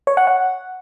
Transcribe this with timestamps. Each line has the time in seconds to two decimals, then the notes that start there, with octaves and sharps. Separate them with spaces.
0.07 C#5
0.17 F#5
0.27 F#5